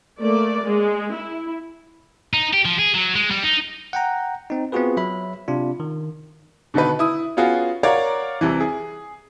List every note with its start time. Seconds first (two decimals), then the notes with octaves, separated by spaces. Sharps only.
0.20 A3 A#3 D5
0.65 G#3
1.15 E4
2.34 D#4
2.53 G4
2.65 F3
2.79 G#4
2.94 F#3
3.15 G#3
3.31 G3
3.44 D#4
3.93 F#5 G5 A#5
4.50 C4 D#4
4.72 B3 C4 F4 F#4 G#4 B4
4.97 F#3 E5 B5
5.48 C3 D4 F4
5.80 D#3
6.74 B2 D3 D#3 D#4 B4
6.99 E4 D#6
7.37 B3 C#4 F4 F#4 G#4
7.83 A#4 C#5 D5 F5 F#5 A#5
8.41 C2 C3 E3
8.60 G#4